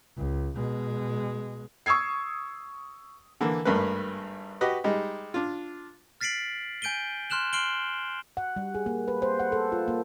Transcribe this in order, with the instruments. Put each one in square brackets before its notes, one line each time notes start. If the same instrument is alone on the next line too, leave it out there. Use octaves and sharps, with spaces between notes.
[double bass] C#2
B2 G#3
[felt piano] C#6 D#6 E6 G#6 C7
[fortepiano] D3 E3 A#3
G#1 G2 A3 A#3 A#4 B4
F#4 G4 B4 D#5
G3 G#3 D#4
D4 F4
[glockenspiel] F6 A6 B6 C7 D7 F#7
G#5 G6 D7 D#7 G7
C6 F6 F#6 E7 F#7
C6 F6 C7 D7 F#7 G7
[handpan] F#5
G3
G#4
A#3
B4
C5
F#5
A4
F4
A#3